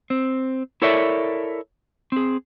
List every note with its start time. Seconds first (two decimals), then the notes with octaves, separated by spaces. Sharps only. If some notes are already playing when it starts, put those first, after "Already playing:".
0.10 C4
0.82 E4 A4 A#4 C#5 D5 E5
2.12 C4 G#4